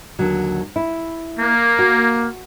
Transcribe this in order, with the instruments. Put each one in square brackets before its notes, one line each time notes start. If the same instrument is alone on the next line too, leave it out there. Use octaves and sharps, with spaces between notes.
[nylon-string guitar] D#2 D3 F#3
E4
[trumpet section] A#3
[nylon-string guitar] F#4